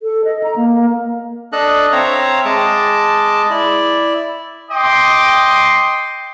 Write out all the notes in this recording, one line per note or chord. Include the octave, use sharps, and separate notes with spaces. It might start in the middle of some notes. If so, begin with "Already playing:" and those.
A4
D#5
A#5
A#3
D4 A4 D#5 F#6
C4 C#5 E5 F5 A#5
G#3 D#5 A5 D6
E4 D5
D#5 G5 C6 D6